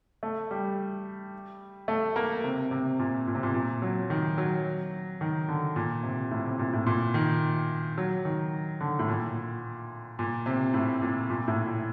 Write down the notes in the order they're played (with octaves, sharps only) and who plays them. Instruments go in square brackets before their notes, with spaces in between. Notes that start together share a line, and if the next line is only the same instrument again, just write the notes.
[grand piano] A3
G3
A3
A#3
C3
C3
A#2
A#2
C3
A#2
A#2
F#3
D#3
F#3
D#3
D3
A#2
C3
A2
C3
A#2
A2
A#2
D#3
F#3
D#3
D3
A2
A#2
A#2
C3
A2
A#2
A#2
A2
A#2